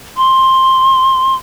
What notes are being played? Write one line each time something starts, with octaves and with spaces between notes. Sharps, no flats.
C6